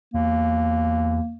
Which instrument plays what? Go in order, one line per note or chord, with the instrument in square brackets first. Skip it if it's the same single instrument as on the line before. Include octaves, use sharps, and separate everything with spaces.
[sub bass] E2 [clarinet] A#3